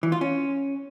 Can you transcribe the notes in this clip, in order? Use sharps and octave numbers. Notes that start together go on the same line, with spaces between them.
E3
F4
C#4